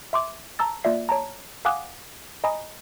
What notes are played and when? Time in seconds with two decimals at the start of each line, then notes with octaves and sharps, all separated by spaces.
0.13 E5 C6 D6
0.59 A5 A#5 E6 A6
0.84 A#3 F4 D5 E5 C7
1.09 C#5 A5 A#5
1.65 F5 F#5 G#5 D6 D#6 F#6
2.44 D#5 G#5 A#5 B5 D#6